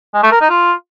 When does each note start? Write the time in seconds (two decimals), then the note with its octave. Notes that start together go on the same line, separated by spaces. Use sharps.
0.14 G#3
0.23 A3
0.32 A#4
0.41 D#4
0.50 F4